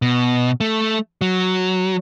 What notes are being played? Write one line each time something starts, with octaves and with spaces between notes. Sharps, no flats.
B2
A3
F#3